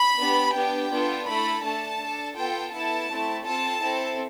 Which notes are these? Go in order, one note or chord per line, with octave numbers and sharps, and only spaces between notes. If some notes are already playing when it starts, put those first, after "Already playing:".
Already playing: B5
B3 D4 G4
B3 D4 G4 G5
B3 D4 F4 A4
A3 E4 A4 B5
A3 D4 A4 A5
D4 A4
B3 F4 A4 G5
B3 E4 A4 A5
A3 C4 E4
C4 F4 A4 A5
C4 E4 A4